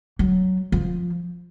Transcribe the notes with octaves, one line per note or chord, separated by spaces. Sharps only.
F#3
F3